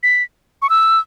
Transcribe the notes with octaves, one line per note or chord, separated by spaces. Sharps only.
B6
C#6
E6